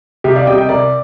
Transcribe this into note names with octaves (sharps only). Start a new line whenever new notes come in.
C2 G4
D5 F5
C3 G3 D#5 G5
D#5 G5
C2 A#4 D5